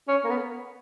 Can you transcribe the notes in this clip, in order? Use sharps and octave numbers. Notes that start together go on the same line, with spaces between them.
C#4
A#3
B3